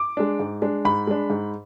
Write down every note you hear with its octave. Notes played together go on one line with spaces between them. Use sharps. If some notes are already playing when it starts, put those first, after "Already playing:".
Already playing: D6
G#3 D4
G#2
G#3 D4
G#2 B5
G#3 D4
G#2